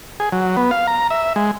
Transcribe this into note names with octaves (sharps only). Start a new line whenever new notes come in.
G#4
F#3
B3
F5
A#5
E5
G#3